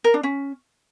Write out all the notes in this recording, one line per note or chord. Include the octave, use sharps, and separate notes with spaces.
A#4
D4
C#4